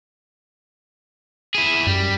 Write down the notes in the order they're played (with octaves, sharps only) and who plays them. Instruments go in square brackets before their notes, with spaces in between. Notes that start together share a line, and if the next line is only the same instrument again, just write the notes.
[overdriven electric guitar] E4 G#4
[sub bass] F#2 [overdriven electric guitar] G3